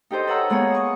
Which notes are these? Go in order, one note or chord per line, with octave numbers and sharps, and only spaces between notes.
D#4 G4 A4 C5 D#5
A4 B4 C#5 F#5 A#5 E6
G#3 A#3 B3 G#4 C#5
C#6 D#6